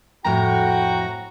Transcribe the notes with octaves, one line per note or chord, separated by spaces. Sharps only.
F2 A2 F#4 G5 A#5